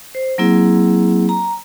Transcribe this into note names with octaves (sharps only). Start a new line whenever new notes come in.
C5
F#3 A#3 C4 E4 G#4
A#5